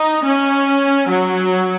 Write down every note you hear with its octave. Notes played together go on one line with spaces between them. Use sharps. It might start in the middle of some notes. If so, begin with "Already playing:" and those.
Already playing: D#4
C#4
F#3